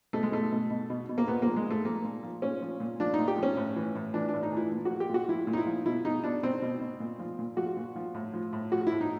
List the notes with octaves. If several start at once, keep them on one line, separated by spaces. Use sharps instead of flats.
B2 A3
G#3
B2 A3
B2
B2
B2
B2
A#3
A#2 B3
F3 A#3
G#3
A#2 A3
F3 A#3
A#2
F3
A#2 C#4
F3
A#2
F3 D4
A#2 D#4
G4
F3 C#4
A2
E3
A2
E3 D4
D4
A2
D#4
E3 E4
A#2
F#4
F3
G4
A#2 F#4
F3 E4
A#2
D#4
E4
F3
B2 E4
B2 D#4
B2 D4
B2 C4
B2
B2
A#2
F3
A#2
F3 F#4
A#2
F3
A2
F3
A2
F3 F#4
A2 E4
D#4